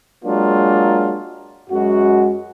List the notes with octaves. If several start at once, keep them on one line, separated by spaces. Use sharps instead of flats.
F#3 G#3 A#3 D4 F4
F#2 G#3 F#4